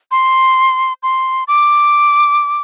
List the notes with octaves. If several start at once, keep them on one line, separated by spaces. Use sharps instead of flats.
C6
C6
D6